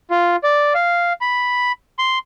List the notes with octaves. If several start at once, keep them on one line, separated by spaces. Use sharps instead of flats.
F4
D5
F5
B5
C6